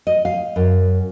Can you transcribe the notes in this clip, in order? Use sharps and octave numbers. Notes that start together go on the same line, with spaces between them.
D#5
F5
F#2